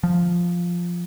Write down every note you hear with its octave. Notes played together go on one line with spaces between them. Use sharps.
F3